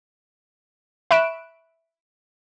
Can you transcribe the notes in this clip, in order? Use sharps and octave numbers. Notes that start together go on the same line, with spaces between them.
E5 B5 C#6 F#6 D7 E7